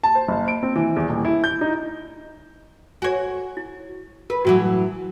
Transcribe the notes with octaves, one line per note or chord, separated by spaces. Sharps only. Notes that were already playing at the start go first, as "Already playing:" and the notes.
A5
C5
F#1
D7
C4
E3
E2
D#1
E4
G6
D#4
F#4 C#5 G#5
E4
A#4 B4
A2 E3 F#3 F#4